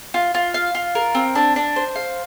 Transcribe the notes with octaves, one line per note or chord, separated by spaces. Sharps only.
F4
F4
F5
F4
A#4
C4
D4
D4
C5
F5